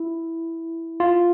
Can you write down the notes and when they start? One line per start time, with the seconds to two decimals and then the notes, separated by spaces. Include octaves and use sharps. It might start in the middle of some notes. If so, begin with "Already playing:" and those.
Already playing: E4
1.00 F4